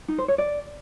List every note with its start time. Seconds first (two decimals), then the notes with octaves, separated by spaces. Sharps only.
0.08 D#4
0.18 C5
0.28 C#5
0.38 D5